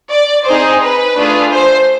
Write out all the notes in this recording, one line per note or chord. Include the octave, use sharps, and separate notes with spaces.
D5
C4 D#4 G#4 C5
B4
A3 D4 F4 G#4
C5